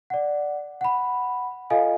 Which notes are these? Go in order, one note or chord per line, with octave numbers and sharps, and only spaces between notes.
D5 F#5
F#5 B5
F4 A4 D#5 F5 G#5